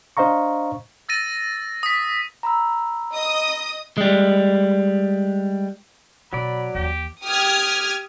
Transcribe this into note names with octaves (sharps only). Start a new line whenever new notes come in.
D4 C5 D#5 F5 A#5 C#6
E6 A6 A#6 D#7
D#6 B6
A#5 B5 E6
D#5 D#6
G3 G#3
B2 F#3 D5 B5
D#2 E3 G4
G4 D#6 F6 G#6